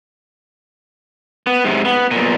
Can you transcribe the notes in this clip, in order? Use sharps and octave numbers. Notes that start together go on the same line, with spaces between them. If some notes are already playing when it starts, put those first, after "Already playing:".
B3
G#2 C3
B3
B1 A#2